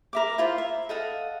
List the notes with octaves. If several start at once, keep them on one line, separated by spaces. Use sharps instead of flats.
A#4 E5 D6
E4 F4 C5
E5
A4 D#5 F5 F#5